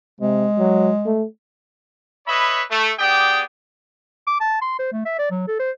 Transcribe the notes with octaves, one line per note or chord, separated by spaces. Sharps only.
C3 G#3
F#3
A3
B4 C#5 D#5 E5 B5
A3
B3 G4 G#4 D5 G5 D#6
D6
A5
C6
C5
A3
E5
D5
F#3
A4
C5